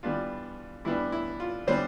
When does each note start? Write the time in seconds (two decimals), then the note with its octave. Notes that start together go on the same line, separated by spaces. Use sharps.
0.03 E3 G3 B3 D4 F4
0.85 E3 G3 B3 D4 E4
1.12 E4
1.40 F4
1.67 E3 G3 B3 D4 C5